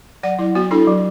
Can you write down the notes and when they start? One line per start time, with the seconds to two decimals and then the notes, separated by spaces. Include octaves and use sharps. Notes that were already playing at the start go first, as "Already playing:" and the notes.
0.23 F#3 D5 F#5
0.39 F#3 E4
0.55 B3 F#4
0.71 D4 E4 A4
0.87 F#3